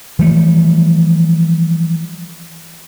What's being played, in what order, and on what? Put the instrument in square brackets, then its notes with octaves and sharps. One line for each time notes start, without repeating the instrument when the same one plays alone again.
[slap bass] E3 F3 G3 A3